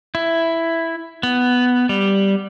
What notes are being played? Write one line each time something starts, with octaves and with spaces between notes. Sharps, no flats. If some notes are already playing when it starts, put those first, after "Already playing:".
E4
B3
G3